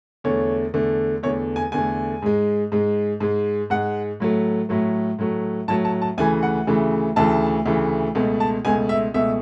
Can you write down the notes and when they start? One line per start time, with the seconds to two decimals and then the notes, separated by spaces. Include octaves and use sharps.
0.24 E2 D3 A3 C#5
0.74 E2 D3 A3
1.23 E2 D3 A3 C#5
1.56 G#5
1.72 E2 D3 A3 G#5
2.22 G#2 G#3
2.72 G#2 G#3
3.20 G#2 G#3
3.70 G#2 G#3 F#5
4.20 A2 F#3 A3
4.69 A2 F#3 A3
5.19 A2 F#3 A3
5.68 A2 F#3 A3 A5
5.85 A5
6.02 A5
6.18 D2 C#3 E3 A3 G#5
6.43 F#5
6.67 D2 C#3 E3 A3
7.16 D2 C#3 E3 A3 A5
7.66 D2 C#3 E3 A3
8.15 C#2 B2 A3
8.40 A5
8.65 C#2 B2 A3 G#5
8.89 E5
9.14 C#2 B2 A3 E5